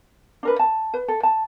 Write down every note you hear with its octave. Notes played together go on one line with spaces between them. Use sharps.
D4 A#4 B4
A5
B4
A4
A5